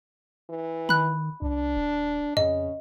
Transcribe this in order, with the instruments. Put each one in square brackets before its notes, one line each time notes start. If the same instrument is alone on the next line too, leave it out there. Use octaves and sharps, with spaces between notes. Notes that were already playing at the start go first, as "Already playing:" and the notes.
[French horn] E3
[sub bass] D#3 [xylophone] B5 F#6
[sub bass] C2 [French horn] D4
[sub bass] D#1
[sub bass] F2 [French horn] C#3 [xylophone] D#5